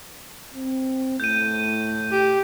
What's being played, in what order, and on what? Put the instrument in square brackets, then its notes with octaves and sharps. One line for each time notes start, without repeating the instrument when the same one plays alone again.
[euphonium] C4
[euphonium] A2 [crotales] G6 D#7
[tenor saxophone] G4